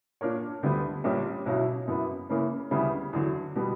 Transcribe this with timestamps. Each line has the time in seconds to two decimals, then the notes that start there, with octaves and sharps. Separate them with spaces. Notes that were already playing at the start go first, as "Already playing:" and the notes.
0.21 A#2 A#3 D4 A#4 C#5
0.63 D2 D3 G3 B3
1.04 A#1 A#2 G3 C#4
1.46 B1 B2 F#3 C#4 E4
1.88 F#2 E3 B3
2.29 C#3 E3 A#3 C#4
2.71 D2 C#3 G3 B3 E4
3.13 E2 D3 F#3
3.55 B2 G3 B3